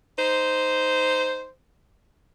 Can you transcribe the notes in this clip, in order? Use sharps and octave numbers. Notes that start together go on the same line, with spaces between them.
D#4 C5